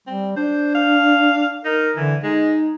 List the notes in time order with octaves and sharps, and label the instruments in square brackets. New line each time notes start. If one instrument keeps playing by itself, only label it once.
[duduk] G3 [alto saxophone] C4
[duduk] D4 [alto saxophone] C5
[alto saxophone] F5
[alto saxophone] D#4 [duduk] A#4
[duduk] D3 [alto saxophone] E3
[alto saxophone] G#3 [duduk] D#4